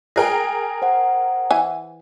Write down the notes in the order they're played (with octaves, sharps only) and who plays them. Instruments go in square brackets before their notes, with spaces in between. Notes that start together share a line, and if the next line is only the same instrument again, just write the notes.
[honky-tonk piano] G#4 A#4 G5 [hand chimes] G#5 F#6 A#6
[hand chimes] C5 F#5
[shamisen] E3 G#5